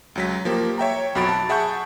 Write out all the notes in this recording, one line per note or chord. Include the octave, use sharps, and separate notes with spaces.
C#2 F#3 B6
F3 A#3 G4
C#5 E5 G5 A#5
B1 F2 F#4 B5 A6 D7
A5
G#4 E5 F#5 A5 C#6 G6